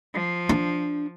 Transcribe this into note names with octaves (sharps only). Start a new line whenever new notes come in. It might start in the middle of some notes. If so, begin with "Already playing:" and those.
F3
D4